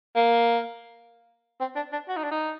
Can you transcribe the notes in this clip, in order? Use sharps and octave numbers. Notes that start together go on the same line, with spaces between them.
A#3
C4
D4
D4
F#4
D#4
D4
D#4